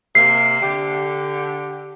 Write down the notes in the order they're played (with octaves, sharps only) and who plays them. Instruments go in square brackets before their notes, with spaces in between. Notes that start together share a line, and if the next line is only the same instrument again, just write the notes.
[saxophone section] C3 A#3 [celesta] C7
[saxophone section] D3 G4